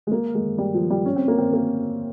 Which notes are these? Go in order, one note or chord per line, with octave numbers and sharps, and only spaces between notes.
G#3
A#3
G#3
G3
F3
G3
C#4
C4
A#3
C4
A#3